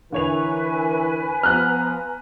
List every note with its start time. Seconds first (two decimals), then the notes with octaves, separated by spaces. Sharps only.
0.12 D3 E3 A#4 B4 C#5 G#5 F7
1.43 F3 B3 A#5 F6 F#6